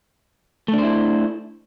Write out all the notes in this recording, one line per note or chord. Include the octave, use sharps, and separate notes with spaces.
A3 D4 E4 C5